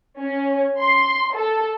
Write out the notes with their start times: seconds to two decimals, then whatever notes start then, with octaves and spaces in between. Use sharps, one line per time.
0.19 C#4
0.78 C6
1.34 A4